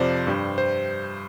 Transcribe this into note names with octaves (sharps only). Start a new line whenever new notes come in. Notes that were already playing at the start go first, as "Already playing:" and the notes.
Already playing: F2 C3 F3 C5 D5
G2 G3
C5